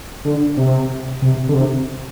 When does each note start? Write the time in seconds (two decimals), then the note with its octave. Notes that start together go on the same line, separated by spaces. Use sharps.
0.25 D3
0.57 C3
1.22 C3
1.49 D3
1.54 C3